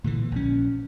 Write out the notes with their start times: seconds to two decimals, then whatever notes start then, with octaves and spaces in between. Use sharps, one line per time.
0.04 A#2 D3 E3
0.32 A#1 C#4